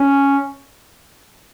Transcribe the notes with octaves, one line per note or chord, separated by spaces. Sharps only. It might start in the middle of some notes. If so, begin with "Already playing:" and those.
Already playing: C#4